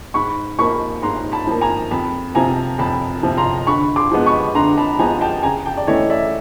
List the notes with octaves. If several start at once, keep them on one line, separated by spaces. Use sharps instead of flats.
G#2 B5 C#6
F3 A#3 B5 C#6
G#2 A#5 C6
A5 B5
F3 A#3
G#5 A#5
F2 A5 B5
C3 F3 G#5 A#5
F2 A5 B5
C3 F3
A#5 C6
D3 B5 C#6
C6 D6
F3 G#3 B3
B5 C#6
D3 A#5 C6
A5 B5
F3 G#3 B3 G#5 A#5
G5 A5
C#3 G#5 A#5
G5 A5
D5
E3 A3 C#4 E4 C#5 D#5
D5 E5